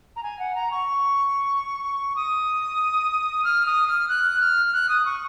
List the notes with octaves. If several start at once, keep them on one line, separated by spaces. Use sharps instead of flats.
A#5
G#5
F#5
A#5
C#6
D#6
F6
D#6
F6
F#6
F6
F#6
D#6
C#6